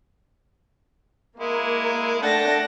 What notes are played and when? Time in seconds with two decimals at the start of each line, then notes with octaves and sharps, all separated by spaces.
1.40 G#3 A#3 E4
2.23 A3 D4 F#5 G5 A5 A#6